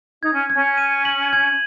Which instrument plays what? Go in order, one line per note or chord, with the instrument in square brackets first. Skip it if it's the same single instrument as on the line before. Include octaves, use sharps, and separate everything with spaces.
[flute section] D#4 [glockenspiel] G#6
[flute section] C#4
[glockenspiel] G#6
[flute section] C#4
[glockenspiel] D#7
F#7
G#6